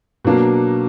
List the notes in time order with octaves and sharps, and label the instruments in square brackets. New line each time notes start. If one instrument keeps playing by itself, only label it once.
[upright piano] B2 F#3 A#3 D4